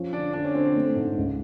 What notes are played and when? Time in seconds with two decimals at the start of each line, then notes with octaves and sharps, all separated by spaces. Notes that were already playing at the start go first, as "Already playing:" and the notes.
Already playing: F3 C#4
0.13 D3 D4
0.33 D3 D4
0.44 C#4
0.54 D3 C4
0.65 C4
0.75 A3
0.95 G#2
1.17 C#2